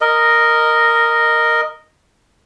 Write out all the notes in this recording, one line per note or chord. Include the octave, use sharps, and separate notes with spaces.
A#4 D#5